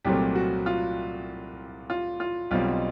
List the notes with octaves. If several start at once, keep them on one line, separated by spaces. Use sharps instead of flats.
C2 A#2 F#3 A3 C4 G4
F#4
F4
F4
F4
B1 B2 G3 C4 F4